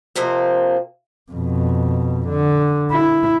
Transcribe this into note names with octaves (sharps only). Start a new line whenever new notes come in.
F2 C3 F3 A#3 C4
F2 B2
D3
E4